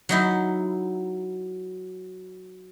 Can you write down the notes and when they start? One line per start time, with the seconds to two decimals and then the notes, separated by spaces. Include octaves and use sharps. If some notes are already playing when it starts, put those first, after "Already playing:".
0.09 F#3 D#4 E4